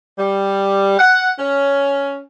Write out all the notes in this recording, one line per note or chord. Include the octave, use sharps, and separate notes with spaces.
G3
F#5
C#4